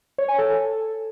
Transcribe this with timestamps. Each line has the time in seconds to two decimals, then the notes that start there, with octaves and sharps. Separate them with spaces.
0.18 C#5
0.28 G#5
0.38 A4